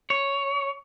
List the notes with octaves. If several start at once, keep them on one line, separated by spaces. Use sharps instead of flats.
C#5